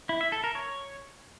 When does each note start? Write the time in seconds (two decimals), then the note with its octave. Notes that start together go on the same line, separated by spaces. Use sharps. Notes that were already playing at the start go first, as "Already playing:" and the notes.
0.09 E4
0.21 E5
0.32 A4
0.44 A#4
0.55 C#5